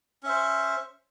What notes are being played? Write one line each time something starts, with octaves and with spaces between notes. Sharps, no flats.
C#4 C5 E5